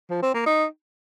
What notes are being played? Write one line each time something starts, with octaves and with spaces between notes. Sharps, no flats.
F3
C4
A#3
D#4